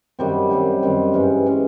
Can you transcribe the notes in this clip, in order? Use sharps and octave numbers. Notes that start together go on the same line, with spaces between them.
F#2 D#3 G3 C4
F#2 D#3 G3 C4
F#2 D#3 G3 C4
G2 E3 G#3 C#4
E3 G#3 C#4